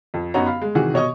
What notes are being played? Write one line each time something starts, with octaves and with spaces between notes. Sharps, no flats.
F2
F#2 B3 D#4 F#4 C#5 A#5
F5 B5
G#3
C3 D#3 E3 F#4 G#4
B2 C#5 D#5 C#6 D#6